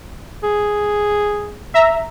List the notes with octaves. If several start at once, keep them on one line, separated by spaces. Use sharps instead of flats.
G#4
E5 A#5